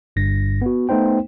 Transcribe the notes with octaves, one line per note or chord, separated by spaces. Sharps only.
G1 G2 A#6
B3 F#4
A3 B3 D#4 C5 G5